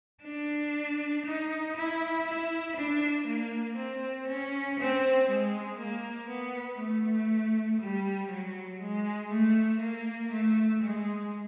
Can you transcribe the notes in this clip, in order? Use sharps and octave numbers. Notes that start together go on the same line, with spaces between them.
D4
D#4
E4
E4
D4
A#3
C4
C#4
C4
G#3
A#3
B3
A3
G3
F#3
G#3
A3
A#3
A3
G#3